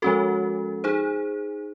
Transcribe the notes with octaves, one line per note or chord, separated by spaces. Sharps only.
F3 G#3 C#4 F#4 A4
D#4 G#4 C5